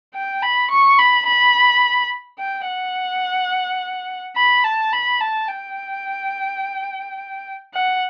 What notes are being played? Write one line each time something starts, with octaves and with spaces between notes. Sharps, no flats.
G5
B5
C#6
B5
B5
G5
F#5
B5
A5
B5
A5
G5
F#5